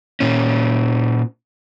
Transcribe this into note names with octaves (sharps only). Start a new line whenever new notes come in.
A#2 C#4